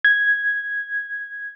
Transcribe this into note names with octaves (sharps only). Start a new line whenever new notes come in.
G#6